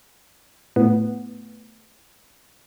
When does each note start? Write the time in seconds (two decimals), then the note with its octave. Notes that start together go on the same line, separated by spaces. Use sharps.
0.76 A2 B3